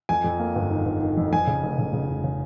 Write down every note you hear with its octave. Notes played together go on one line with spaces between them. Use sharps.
F2 G#5
F2
A#3
G1
D#3
G1
D#3
F2
F2 G#5
C#3
F1
C#3
C#3
F1
C#3